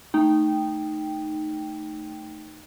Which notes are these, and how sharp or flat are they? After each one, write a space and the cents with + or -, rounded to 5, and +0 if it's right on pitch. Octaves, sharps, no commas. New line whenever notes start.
A3 +0 D#4 -10 G5 +0